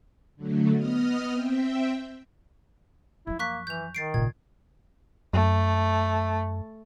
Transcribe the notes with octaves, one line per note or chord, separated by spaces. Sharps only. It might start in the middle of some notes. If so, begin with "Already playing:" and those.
D3 F#3 A3
B3 D#5 D#6 F6
C4 E5 G5
F#2 F3 E4
A#3 C#6 F#6 B6
E3 G6 F7
D#3 A6 C7 D7
G#1 A#2 C#3 G#6
F#2 A3